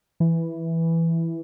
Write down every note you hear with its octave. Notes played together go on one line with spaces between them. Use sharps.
E3